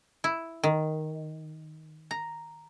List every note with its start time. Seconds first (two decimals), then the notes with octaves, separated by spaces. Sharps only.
0.24 E4
0.63 D#3
2.11 A#5